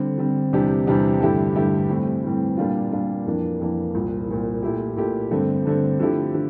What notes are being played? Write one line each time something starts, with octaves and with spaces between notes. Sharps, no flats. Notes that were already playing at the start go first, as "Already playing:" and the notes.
Already playing: D3 G3 C4
D3 G3 C4
E2 C3 G3 D4 G4
E2 C3 G3 D4 G4
G2 D3 A3 E4 G4
G2 D3 A3 E4 G4
A2 E3 G3 C4
A2 E3 G3 C4
A#2 G3 A#3 D4 F4
A#2 G3 A#3 D4 F4
F2 E3 A#3 D4
F2 E3 A#3 D4
C2 A#2 F3
C2 A#2 F3
A#2 A3 E4 G4
A#2 A3 E4 G4
G2 D3 A3 C4
G2 D3 A3 C4
D3 F3 A3 E4 G4
D3